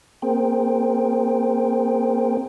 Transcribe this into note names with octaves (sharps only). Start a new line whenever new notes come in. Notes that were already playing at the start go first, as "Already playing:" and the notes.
A#3 C4 G#4 A#4 C5 G5